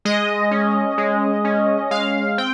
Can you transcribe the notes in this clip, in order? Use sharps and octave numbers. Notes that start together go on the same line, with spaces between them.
G#3 D#5
C#4
G#3
C#4
G#3 F5
C4 G5